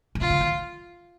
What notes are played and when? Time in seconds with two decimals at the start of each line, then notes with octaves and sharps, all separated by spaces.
0.15 D#3
0.20 D3 F4
0.30 D3
0.41 D#3